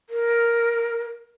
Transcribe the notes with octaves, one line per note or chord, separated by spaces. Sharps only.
A#4